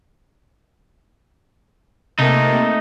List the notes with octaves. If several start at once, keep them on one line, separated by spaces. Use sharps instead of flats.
C3 A3 A#3 D#4